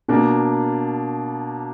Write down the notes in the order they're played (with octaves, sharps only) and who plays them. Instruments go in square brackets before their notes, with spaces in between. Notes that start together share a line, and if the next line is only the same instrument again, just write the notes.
[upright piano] B2 A#3 D4